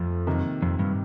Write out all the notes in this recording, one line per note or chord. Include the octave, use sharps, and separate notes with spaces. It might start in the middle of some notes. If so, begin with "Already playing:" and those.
Already playing: F2 F3 A3
C3 D#3 A#3
F2
G2